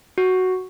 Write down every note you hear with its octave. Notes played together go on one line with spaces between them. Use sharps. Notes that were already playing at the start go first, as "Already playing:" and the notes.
F#4